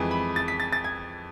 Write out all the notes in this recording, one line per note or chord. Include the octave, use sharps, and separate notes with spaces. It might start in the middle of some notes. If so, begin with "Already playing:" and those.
Already playing: F2 E3 G#3
B5
A6
B6
A6
A6
G#6